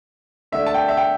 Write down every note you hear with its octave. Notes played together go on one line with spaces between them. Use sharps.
D3 A3 D4 E5
A5
G5
E5
G5